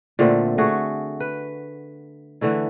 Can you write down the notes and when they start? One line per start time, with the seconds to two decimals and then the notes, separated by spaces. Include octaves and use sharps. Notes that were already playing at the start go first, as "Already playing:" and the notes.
0.19 A#2 D3 A3 C4
0.58 A3 F#4 G#4
1.20 B4
2.41 D3 E3 A3 E4